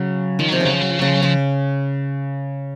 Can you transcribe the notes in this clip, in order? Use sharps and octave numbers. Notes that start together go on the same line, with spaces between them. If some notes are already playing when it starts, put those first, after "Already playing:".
Already playing: C#3 F#3
D#3 F3
F#3
C3 F3
C#3 F#3
F3
F#3
F3
C#3 F#3
F3
F#3
C#3 F3